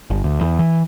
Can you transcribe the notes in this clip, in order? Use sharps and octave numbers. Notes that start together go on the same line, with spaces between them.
G1
D2
E2
E3